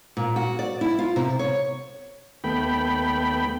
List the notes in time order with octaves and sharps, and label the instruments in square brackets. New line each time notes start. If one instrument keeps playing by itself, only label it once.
[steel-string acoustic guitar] A#2
F#4
D5
E4
F4
C3
C#5
[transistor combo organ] D#2 A3 B3 G5 B5